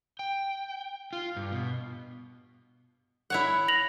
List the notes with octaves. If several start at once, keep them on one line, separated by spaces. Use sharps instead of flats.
G5
F4
G2
B2
E4 C#5 F#5
A#6 F7 F#7